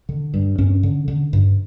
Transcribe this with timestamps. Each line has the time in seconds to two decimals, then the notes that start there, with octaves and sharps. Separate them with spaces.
0.09 D3
0.34 G2
0.58 G2 C#4
0.83 D3
1.08 D3
1.33 G2